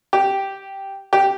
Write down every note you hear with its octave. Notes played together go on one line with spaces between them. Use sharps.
G4
G4